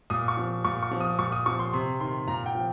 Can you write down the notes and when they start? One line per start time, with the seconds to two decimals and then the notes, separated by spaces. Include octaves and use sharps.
0.10 A#2 D#6
0.28 C#6
0.37 F3
0.65 A#2 C#6
0.83 C#6
0.91 F3
1.00 D#6
1.19 A#2 C#6
1.32 D#6
1.46 F3 C#6
1.59 C6
1.73 C3 C6
2.00 D#3 C6
2.27 A#2 A#5
2.46 G5
2.55 F3